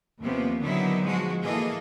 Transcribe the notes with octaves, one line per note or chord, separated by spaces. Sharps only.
D#2 C3 F3 A#3 B3 C#4
D3 D#3 F#3 B3 D#4 E4
F3 G#3 F#4
E3 A#3 G#4 A4 D#5